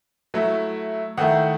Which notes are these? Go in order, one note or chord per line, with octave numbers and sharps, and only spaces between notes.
F#3 A3 E4
D#3 A3 E4 F#5